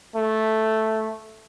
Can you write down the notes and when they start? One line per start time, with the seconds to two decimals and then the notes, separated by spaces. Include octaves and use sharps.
0.16 A3